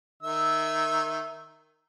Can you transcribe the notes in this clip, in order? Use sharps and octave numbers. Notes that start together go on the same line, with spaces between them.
D#3 E5 E6